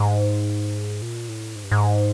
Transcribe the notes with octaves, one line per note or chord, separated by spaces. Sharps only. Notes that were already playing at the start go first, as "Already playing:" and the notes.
Already playing: G#2
A#2
A2
G#2
G2
G#2